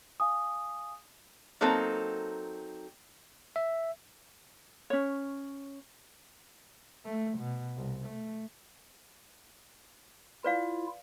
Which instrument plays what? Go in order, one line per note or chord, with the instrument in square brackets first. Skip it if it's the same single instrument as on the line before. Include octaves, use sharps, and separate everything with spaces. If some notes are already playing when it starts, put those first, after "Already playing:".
[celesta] F5 G#5 D#6
[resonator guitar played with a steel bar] F#3 A#3 C4 D#4 A4
[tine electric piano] E5
[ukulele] C#4 C#5
[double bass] A3
B2
C2
A3
[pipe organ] E4 F4 [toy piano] B4 D5 F5